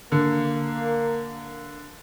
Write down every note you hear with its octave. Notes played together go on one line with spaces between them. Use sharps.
D3 A#3